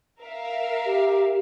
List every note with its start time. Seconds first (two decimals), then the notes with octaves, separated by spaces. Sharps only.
0.21 A#4 E5 F5
0.86 G4